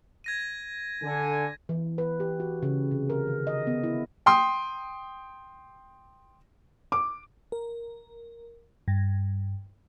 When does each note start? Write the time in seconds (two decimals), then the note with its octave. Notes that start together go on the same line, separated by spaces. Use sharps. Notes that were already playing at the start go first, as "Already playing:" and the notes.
0.24 G#6 A#6 D#7
1.02 D3 G#5
1.69 E3
1.98 B4
2.20 G4
2.40 F#4
2.63 C#3
2.91 C3
3.10 A#4
3.27 D#3
3.47 D#5
3.67 B3
3.83 E4
4.26 G5 C6 D#6
6.92 D6
7.52 A#4
8.88 G2